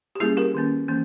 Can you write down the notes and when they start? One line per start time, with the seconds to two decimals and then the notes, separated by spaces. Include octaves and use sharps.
0.15 G4
0.20 G3 A#3 C#4 E4 G#4
0.37 G4 A#4
0.54 D#3 A#3 C#4
0.88 E3 A#3 C#4